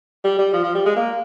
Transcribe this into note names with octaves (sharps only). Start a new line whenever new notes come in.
G3
G3
F3
F3
G3
G#3
A#3